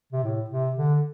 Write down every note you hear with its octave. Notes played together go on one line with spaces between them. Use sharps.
C3
A2
C3
D3